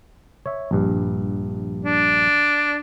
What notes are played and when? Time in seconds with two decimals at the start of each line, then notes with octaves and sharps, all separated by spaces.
0.46 C#5 E5
0.71 A#1 G2
1.84 D4